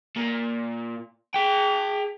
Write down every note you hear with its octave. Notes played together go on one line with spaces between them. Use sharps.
A#2
G#4 G5